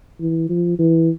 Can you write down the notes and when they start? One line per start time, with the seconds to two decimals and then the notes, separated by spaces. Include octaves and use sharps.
0.20 E3
0.49 F3
0.79 E3